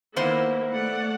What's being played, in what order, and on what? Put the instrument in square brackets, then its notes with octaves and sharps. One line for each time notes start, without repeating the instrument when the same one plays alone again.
[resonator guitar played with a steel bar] D#3 B3 C5 [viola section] A#3 E4
[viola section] A3 D5 F#5